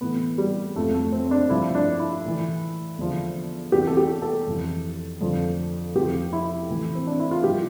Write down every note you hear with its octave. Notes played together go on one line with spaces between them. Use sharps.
A2 E3 B3
G3
F2 C3 F3 A3
A3
C4
D4
G2 F3 E4
D4
E4
A2 E3
E2 D3 F3
E2 C3 E3 G4
A4
G4
A4
F2 E3
F2 D3 F3
F2 C3 F3 G4
E4
A2 E3
C4
D4
E4
F4
G2 F3 G4